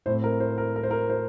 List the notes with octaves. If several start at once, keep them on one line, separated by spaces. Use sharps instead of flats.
A2 A3 C4 C5
A#4
C5
A#4
A#4
C5
A#4
C5